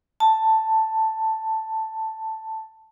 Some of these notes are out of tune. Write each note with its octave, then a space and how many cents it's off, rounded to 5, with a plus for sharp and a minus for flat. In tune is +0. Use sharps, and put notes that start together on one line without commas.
A5 +5